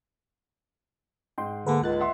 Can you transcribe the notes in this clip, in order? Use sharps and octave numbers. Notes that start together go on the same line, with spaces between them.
G#2 G5 C6
D3 A#3 G#4 B4
C#2 F#6 A6
E5 F#5 C6